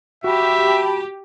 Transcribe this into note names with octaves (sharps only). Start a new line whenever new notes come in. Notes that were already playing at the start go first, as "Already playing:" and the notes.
F#4 G4 E5 G5 A5 B5